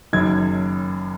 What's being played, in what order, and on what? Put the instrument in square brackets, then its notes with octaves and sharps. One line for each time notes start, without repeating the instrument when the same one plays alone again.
[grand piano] F#1 F#2 D#3 G#6